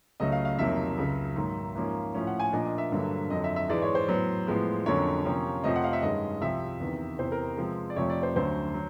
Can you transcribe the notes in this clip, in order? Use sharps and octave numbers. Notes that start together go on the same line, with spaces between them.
C#2 C#3 F#3 A3 D#5
F5
F5
F2 C3 D#3 F#3 A#3 E5
C#2 C#3 F#3
G#2 D#3 F#3 A#3
G#2 F3 A#3 C#4
A2 F3 A3 C#4
F#5
G#5
A#2 F3 A#3 D4 D#5
D#5
E5
G2 D3 F#3 A#3
F2 D3 F#3 D#5
E5
E5
G#2 E3 G#3 D5
C#5
C5
A2 F#3 B3
A2 F3 G#3 B3
F2 D3 F#3 A#3 C#4 C#5
C3 F3 A#3 C#4
F2 C3 F3 A3 C4 D#5
F#5
F5
E5
G2 D#3 G#3 C#4 D#5
C2 C3 F3 E5
E2 C3 D#3
E2 C3 E3 C5
A#4
C3 F3 G#3 C4
D5
F2 C3 F3 A3 C#5
D5
C5
D2 D3 F#3 A3 C#4 C5
F#3